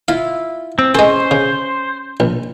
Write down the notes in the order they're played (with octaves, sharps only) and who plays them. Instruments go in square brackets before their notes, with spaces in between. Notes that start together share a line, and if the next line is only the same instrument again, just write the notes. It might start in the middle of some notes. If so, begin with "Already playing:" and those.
[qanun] E4 F4 [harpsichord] F5
[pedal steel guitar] C4
[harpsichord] G#3 A4 [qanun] C#4 [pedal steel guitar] C5
[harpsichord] C#3
A#1